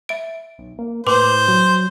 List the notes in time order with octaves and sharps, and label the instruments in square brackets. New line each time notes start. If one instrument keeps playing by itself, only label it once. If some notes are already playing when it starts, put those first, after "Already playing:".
[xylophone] E5 D7
[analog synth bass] B1
A#3
[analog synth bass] A2 [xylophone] B4 C6 D6 [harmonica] C5
[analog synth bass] F#3